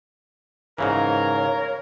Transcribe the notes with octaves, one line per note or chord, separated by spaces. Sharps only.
G#2 C#3 E3 A#4 C#5 F5